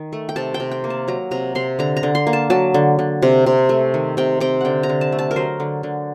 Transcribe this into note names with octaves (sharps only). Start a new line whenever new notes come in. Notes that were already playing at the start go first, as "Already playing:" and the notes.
Already playing: D#3
A3
G5
C3 A5
G5
C3
G5
A#3
A5
F#3 A#5
C3 A#5
C3 C6
D3 A#5
A#5
D3
C6
A#3
A5
F#3 A5
D3
D3
C3
C3
A3
D#3
C3 G5
C3 G5
D3 F#5 G5
A#5
D3
A5
A3
A5
A#4
F#3 C5
D3
D3